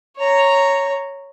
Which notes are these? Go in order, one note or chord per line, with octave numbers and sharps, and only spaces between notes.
C#5 A#5